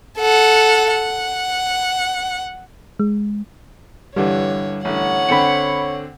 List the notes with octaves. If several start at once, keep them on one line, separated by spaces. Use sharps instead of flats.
A4 F#5
F#5
G#3
G2 D3 E3 G3 C#5
A1 D3 C#5 F#5
D3 C4 G5 B5 C#7